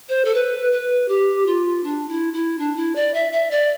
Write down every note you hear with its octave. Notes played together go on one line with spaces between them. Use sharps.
C5
A4
B4
B4
G4
F4
D4
E4
E4
D4
E4
D5
E5
E5
D5